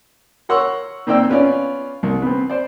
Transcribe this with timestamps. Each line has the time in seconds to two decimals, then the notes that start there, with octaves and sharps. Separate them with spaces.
0.49 A#4 C#5 F#5 C6 C#6 E6
1.07 A#2 C4 D#4 D5 G5 E6
1.30 B3 C#4 F4 D5
2.03 C2
2.22 B3 C4
2.50 C5 D5